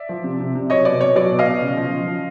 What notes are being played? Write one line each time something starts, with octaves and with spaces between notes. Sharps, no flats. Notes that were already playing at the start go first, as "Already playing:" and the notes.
Already playing: D5 E5
F3
C3
C3
C3
F#3 C#5 D#5
B2 D5
B2 C#5
F#3 D5
B2
D#5 F5
B2
C#3
F3
F3
F3